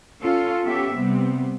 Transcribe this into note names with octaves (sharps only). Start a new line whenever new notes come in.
C#4 F4 A4
B3 C#4 G4 A4 E5
C3 G3 B3 C4